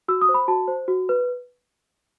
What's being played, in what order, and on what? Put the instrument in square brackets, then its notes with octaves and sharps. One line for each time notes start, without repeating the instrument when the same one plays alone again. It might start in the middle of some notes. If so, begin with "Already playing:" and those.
[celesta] F#4 E6
D#6
C5
B5
F#4 A5
C5
F#4
B4